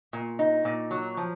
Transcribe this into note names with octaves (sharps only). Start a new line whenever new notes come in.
A#2
D#4
A#2
F#3
F3